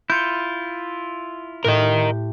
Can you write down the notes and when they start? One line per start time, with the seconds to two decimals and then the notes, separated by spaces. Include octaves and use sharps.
0.10 E4 F4 G6 C#7
1.64 A2 G4 A#4 D#5